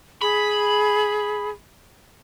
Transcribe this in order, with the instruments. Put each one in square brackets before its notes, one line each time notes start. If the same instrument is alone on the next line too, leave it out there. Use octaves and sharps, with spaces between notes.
[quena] G#4 [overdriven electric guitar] B5